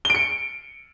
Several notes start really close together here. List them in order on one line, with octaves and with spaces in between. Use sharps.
G7 D7 C#7